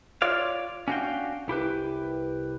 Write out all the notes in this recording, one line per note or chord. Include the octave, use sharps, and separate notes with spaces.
F4 C#5 D5 F5
C#4 D4 F#4 C5 F5 G5
C2 E4 G4 B4